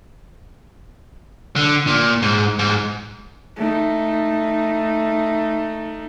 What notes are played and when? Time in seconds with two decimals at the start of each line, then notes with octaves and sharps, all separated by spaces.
1.56 D3
1.87 A#2
2.22 G#2
2.59 G#2
3.56 A3 D#4